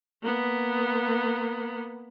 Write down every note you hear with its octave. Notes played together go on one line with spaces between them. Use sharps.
A#3 B3